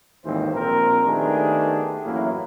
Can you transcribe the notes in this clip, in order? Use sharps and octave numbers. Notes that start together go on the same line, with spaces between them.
G#1 D#2 A2 E3 C4 C5
A#1 C4 A#4
D#3 A3 B3 D4 G4 G#4
A1 F#2 A2 A#3 E4